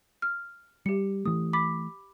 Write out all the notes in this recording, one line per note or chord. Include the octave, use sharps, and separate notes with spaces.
F6
G3 G4 C#7
E3 A3 D#6
B5 D6 B6